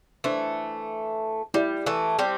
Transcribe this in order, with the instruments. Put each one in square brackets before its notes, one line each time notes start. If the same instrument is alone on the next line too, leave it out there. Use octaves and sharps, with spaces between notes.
[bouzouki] E3 A3 [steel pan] D4 C5 E5 C6
[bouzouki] G3 [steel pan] E4 G4 D5
[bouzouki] E3 A3
G3 C4